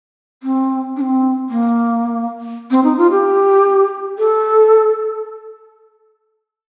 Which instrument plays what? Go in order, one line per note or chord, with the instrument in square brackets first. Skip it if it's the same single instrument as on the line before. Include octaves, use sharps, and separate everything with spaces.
[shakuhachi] C4
D4
C4
A#3
C4
D#4
F4
G4
A4